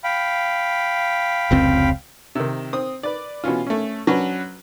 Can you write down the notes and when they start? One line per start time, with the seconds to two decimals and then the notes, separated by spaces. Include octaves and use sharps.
0.04 F5 G5 B5
1.51 F1 C#2 C4
2.35 C3 D#3
2.73 C4 D#6
3.03 B4 D5
3.44 B2 E3 C#4 F4
3.67 A3 C#4
4.07 F#3 C#4 D4 F#4 B4